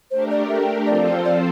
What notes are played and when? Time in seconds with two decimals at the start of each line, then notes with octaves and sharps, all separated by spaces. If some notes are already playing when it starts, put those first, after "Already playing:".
0.11 A3 D4 G4 A#4 C5
0.30 D5
0.49 E5
0.62 G5
0.87 F3 C4 F4 A4 C5 D5
1.25 D5